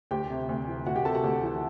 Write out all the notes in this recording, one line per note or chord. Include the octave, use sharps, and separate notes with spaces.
D2 G4 G5
C3
D2
E3
D2 F#4 F#5
G4 G5
C3 A4 A5
F#4 F#5
D2 G4 G5
E3